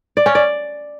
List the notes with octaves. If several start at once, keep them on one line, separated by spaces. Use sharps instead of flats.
D5
C#4
D5